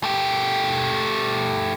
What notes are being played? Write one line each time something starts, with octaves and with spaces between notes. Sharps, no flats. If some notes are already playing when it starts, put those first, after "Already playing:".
A3 G4